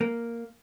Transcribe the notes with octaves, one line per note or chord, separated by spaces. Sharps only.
A#3